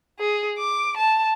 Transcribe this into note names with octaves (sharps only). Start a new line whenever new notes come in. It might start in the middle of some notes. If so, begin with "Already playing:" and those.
G#4
D6
A5